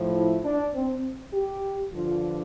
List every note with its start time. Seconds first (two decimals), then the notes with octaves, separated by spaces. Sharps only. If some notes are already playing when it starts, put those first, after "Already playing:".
Already playing: A2 F3
0.14 E4
0.44 D4
0.74 C4
1.33 G4
1.93 G2 D3 F3 F4